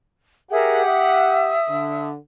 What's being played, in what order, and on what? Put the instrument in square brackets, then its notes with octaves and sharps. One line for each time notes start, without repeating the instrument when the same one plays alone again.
[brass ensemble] G4 F#5 [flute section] G#4 A#4 E5
[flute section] E5 D#6
[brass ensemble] D3